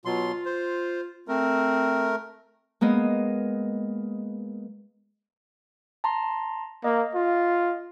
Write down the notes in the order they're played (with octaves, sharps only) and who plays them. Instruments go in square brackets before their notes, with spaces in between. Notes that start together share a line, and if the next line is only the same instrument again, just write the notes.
[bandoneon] B2 F#3 C6 [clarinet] F4
[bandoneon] C5
[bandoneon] A3 A#4 [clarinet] C4
[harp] G#3 A#3 B3 D#5
[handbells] A5 A#5 C6
[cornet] A#3 [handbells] D#5
[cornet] F4